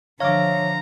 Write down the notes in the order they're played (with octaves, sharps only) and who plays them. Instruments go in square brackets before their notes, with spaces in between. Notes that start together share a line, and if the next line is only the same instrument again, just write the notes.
[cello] D3 F3 [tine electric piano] C#5 E5 D6 [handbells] F5 F6 [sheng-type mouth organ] A#5